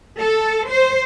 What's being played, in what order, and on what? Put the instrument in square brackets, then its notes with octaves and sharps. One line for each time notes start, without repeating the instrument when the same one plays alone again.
[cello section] A4
C5